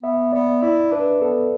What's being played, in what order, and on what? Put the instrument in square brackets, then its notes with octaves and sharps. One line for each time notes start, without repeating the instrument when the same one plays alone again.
[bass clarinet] B3 [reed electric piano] E5
[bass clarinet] B3 [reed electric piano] D5
[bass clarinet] E4 [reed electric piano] D5
[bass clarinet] D4 [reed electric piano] B4
[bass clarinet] B3 [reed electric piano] A4